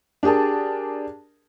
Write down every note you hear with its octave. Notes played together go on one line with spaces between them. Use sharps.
D4 G4 G#4 A#4 A5